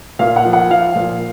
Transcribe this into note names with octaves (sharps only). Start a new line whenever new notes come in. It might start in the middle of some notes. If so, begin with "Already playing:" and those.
A#2 F5
F#5
F3
F#5
F3 F5
A#2